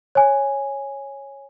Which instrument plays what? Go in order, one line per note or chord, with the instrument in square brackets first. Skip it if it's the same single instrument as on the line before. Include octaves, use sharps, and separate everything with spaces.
[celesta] C#5 G#5